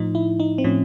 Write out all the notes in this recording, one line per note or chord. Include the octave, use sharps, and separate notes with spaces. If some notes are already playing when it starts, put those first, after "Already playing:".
Already playing: A2 F3 D#4
E4
D#4
C4
A2 F3 C#4